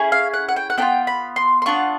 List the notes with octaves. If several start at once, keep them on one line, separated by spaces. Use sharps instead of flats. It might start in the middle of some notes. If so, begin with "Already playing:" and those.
Already playing: C#4 E4 G#4
F5
F#5
F#5
G5
F#5
B3 D4 F4 G5
B5
C6
C6
B3 D4 F4 C#6